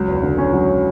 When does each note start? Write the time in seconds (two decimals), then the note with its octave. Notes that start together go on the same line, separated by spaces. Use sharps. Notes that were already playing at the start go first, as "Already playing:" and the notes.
Already playing: C#2 F#3
0.08 E2
0.23 D3
0.38 C#4
0.53 F#3